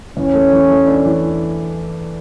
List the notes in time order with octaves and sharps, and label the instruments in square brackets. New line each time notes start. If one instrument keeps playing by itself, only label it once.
[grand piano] E2 [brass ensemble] C#4
[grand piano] A3
E3
A3
D4
E3